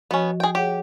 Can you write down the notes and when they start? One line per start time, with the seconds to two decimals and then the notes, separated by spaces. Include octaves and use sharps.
0.11 F3 B3 C#4 F#4 D#5
0.40 G#4 G5
0.55 G4 G#4 C#5 F#5